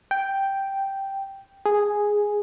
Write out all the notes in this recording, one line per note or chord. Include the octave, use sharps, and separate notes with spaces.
G5
G#4